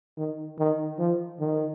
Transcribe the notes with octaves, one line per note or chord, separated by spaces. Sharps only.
D#3
D#3
F3
D#3